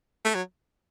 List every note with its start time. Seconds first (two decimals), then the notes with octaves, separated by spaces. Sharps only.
0.24 A3
0.35 F#3